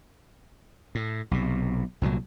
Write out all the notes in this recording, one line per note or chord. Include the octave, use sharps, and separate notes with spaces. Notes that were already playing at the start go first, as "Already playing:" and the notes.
A2
B1 C3
C2 A#2 E3 F#3